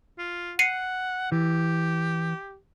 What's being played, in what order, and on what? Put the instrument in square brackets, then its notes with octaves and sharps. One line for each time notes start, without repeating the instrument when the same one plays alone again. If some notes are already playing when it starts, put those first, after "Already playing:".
[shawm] F4
[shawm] F#5 [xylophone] C7 C#7 D#7
[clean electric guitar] E3 [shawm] G4